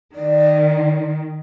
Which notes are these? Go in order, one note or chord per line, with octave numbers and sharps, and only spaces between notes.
D#3 D5